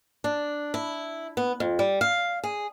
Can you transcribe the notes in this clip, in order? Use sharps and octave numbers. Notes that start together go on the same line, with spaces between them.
D4
E4
B3
F2
G3
F5
G#4